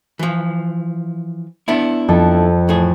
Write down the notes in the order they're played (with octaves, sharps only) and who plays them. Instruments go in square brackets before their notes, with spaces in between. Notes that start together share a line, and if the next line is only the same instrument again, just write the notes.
[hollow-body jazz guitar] E3 F3
B3 D4 E4
[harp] F2 C4 A4
[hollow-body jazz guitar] A2 E3 G#4